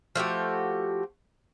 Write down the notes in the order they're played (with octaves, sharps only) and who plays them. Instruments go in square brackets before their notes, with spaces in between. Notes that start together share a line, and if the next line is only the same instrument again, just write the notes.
[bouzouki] F3 A3 F#4 G4